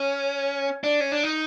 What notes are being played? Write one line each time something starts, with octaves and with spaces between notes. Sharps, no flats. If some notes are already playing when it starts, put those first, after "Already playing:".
Already playing: C#4
D4
C#4
D4
D#4